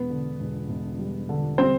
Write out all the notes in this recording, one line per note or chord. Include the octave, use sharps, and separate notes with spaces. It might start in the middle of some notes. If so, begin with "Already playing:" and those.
Already playing: E1 B3 B4
D3
E1
E1
G3
D3
G3 C4 C5